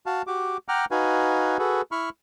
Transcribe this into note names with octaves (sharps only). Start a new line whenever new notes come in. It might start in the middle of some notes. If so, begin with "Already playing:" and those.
F#4 F5 A5
F#4 G4 D6
F#5 G5 A#5 D6 F6
D#4 F#4 B4 F5 G#5
F#4 G#4 A4 B4
E4 B5 C#6 F6